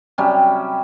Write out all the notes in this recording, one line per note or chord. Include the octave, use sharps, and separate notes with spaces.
C3 F#3 G3 C#4